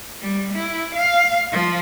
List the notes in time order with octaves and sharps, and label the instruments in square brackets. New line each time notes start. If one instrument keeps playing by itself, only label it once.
[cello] G3
E4
F5
F3